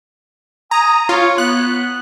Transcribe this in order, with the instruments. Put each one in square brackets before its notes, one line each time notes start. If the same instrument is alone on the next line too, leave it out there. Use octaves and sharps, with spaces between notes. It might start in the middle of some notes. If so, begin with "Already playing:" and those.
[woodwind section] G#5 D#6 [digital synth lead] A#5
[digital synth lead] F4 [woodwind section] C#5
[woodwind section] B3 [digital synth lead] F#6